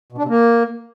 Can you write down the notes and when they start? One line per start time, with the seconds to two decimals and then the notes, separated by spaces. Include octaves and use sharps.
0.12 B2
0.18 D4
0.23 C3
0.29 A#3